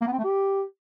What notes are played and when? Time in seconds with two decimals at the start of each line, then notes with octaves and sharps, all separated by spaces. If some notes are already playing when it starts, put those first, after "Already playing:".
0.01 A#3
0.07 B3
0.13 C4
0.18 A3
0.24 G4